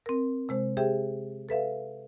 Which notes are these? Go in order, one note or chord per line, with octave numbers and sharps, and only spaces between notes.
C4 A#4
C3 G#3 C5
G4 G#4 C5 E5 G5
A4 B4 E5 F5